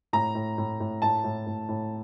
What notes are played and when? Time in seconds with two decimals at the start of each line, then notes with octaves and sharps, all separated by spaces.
0.13 A2 A#5
0.35 A2
0.58 A2
0.80 A2
1.02 A2 A5
1.24 A2
1.47 A2
1.69 A2